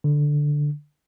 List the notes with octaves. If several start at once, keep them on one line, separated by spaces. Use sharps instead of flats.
D3